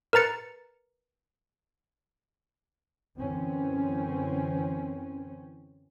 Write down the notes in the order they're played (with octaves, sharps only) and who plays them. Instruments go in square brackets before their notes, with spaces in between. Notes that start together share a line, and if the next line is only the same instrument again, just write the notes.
[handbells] A#4 B4 A#5 A6 C#7
[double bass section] F#2 D3 E3 C4 C#4